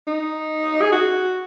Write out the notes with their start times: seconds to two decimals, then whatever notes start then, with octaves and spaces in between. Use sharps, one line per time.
0.07 D#4
0.82 G#4
0.92 F#4